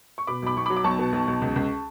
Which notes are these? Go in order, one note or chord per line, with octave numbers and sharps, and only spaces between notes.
C#6
B2 B5 D6
B1 B5 D6
B1 C#6
F#3 B5 D6
D6
B1 A5 C#6
B2
B1
B1
C#2
C#2